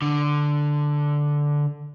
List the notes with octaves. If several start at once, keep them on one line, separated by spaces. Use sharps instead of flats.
D3